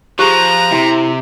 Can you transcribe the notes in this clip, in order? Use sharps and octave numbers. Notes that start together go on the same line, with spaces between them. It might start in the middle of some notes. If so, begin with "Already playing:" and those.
F3 G4 G#4 A#5 F#6
C3 E4 E5 C6